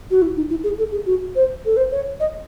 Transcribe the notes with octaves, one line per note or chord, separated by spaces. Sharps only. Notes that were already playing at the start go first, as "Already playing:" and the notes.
F#4
E4
D#4
E4
G#4
A4
G#4
F#4
C5
A4
C5
C#5
D#5